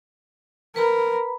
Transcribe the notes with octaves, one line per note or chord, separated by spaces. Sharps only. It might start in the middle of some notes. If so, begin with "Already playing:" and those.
A#4 B4 A#5 B5